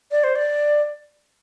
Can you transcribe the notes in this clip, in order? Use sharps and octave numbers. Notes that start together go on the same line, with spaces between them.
D5
C5
D5